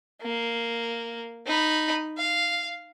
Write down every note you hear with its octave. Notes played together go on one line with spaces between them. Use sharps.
A#3
D#4 B5
F5